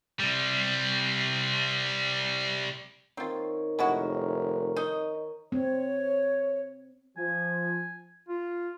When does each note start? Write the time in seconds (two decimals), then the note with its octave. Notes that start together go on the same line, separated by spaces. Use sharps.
0.20 C3 G3
3.17 D#3 C4 F4 C#5
3.79 F1 G#3 E4 F#4 A#4 B4 C#5
4.76 D#4 D#5
5.52 C4 C#5
7.17 F3 G#5
8.29 F4